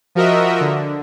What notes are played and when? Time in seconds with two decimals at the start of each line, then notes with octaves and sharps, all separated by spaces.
0.15 F3 F#4 A#4 D#5 E5
0.61 D3